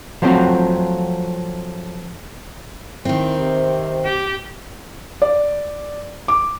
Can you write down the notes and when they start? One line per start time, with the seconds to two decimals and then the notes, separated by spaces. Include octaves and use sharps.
0.22 F3 F#3 A3 C4 F4 F#4
3.05 D#3 C4 E4
3.39 C3
4.05 G4
5.22 D5
6.28 D6